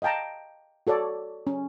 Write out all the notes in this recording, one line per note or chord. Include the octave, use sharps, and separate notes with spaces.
D#5 F5 G5 A5 A#5
F#4 A4 C#5 D5
C#4